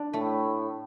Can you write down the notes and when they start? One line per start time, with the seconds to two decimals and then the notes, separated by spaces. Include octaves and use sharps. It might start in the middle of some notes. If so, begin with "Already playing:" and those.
Already playing: D4
0.13 A2 A3